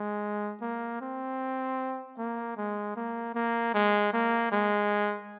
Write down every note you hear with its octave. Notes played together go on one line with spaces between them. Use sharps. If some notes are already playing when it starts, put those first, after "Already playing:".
Already playing: G#3
A#3
C4
A#3
G#3
A#3
A#3
G#3
A#3
G#3